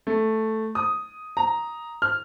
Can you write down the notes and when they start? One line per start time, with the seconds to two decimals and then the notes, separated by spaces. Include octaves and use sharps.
0.07 A3
0.75 D#6
1.37 A#5
2.02 F6